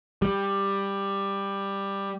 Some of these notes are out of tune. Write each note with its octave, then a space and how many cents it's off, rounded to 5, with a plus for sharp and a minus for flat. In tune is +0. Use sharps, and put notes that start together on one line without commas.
G3 +10